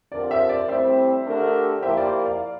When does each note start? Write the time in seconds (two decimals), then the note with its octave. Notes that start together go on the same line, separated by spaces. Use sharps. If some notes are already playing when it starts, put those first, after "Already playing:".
0.12 D3 F3 C4 G4 A#4 D5
0.31 C5 E5
0.49 D5
0.68 A2 G3 C4 C5 E5
1.26 D3 A3 D4 G4 A#4
1.82 F3 A#3 E4 G4 C5 E5 G5
1.97 D5
2.25 D5 F5